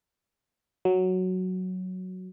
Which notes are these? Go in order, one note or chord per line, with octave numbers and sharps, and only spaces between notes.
F#3